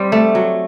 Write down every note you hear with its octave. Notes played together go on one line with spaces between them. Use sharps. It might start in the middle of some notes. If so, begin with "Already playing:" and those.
Already playing: G3 C4 G4
A3
F#3